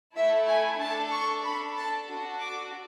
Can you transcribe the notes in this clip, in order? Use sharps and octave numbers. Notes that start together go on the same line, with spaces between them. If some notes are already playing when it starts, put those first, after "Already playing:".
A3 E4 A4 E5
G#5
D4 A4 A5
C#6
D4 A4 B5
A5
D4 F#4 A4
D6